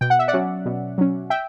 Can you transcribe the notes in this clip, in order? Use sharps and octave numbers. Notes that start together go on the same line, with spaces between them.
B2 G5
F#5
E5
D5 F#5
F#3 C#4
B2
F#3 C#4
E5 G5